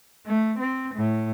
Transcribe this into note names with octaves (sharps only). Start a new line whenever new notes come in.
A3
C4
A2